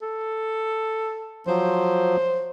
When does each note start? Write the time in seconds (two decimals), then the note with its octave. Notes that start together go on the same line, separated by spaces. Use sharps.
0.02 A4
1.47 F3 F#3 C5